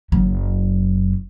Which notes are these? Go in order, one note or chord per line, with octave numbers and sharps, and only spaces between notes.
F#1 F#3